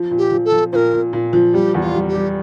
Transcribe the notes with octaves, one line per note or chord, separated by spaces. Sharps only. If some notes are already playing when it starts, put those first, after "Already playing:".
Already playing: F3
A#2
G4
F3
A4
F3
A#2 A#4 C5
A#2
A#2
F3
G3 G4
E2
F4
G3
G4
G3